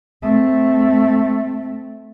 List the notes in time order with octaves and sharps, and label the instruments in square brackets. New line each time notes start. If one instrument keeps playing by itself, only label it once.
[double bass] A3 C4